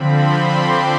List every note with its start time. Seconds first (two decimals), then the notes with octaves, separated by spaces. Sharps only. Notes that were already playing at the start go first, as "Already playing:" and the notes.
Already playing: D3 F3 C4 B5
0.12 C6
0.50 D6